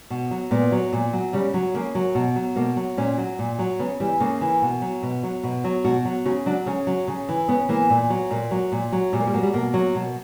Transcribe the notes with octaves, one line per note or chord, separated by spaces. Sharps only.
B2
F#3
A#2 B3
F#3
A#2
F#3
C#3 G3
F#3
C#3 A#3
F#3
B2
F#3
B2 A#3
F#3
A#2 C#4
F#3
A#2
F#3
C#3 B3
E3 G3
C#3 A#3
E3
B2
F#3
B2
F#3
B2
F#3
B2 F#4
F#3
C#3 F#4
F#3 D4
C#3 C#4
F#3
C#3
E3
C#3 B3
E3 A#3
A#2
F#3
A#2 A#3
F#3
A#2
F#3
A#2 G3
A#3
G3
F#3 A#3
G3
B2 A#3
F#3
B2